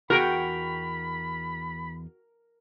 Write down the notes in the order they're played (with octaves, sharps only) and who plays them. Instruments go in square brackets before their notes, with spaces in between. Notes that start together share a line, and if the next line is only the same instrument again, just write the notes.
[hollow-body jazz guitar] E2 G#4 F#5 [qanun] F#4 G5 [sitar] A#4 [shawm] B5